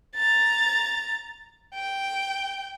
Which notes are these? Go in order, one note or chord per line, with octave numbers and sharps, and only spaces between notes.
A#5 A6
G5